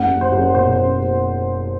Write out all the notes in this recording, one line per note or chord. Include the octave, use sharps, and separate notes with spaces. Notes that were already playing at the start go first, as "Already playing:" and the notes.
Already playing: F#1 F#5
F#1
C5
F#1
B2 C5
F#1